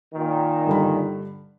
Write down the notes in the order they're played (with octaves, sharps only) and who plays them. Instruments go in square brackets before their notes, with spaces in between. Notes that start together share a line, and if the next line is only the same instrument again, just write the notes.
[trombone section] A#2 D#3
[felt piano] G2 D3 B5